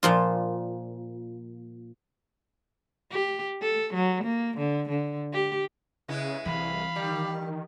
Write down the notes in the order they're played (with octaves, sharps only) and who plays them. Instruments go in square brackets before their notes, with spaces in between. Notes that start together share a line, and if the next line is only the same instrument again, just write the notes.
[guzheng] A#2 F3 F4
[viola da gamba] G4
A4
F#3
A#3
D3
D3
G4
[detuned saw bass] C#3 [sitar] G#3 B3 E4
[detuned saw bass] C2 [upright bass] E3 [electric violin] F5 B5
[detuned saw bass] D#3 [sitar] G3